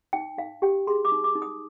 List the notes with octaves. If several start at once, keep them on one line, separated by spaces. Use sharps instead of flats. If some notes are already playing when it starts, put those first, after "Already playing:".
D#4 G5
D#4 F5
G4 G5
G#4 C6
D6
D#4
D6
D#4
D#6